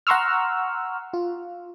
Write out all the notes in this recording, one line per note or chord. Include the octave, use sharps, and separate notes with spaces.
F#5 A#5 C6 C#6 E6 F6
F4